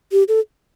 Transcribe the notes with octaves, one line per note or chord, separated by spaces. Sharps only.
G4
A4